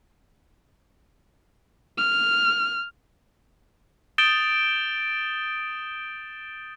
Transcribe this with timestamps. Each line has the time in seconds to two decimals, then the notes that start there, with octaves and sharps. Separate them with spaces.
1.98 F6
4.18 D#6 G6 A6 D7 E7 G7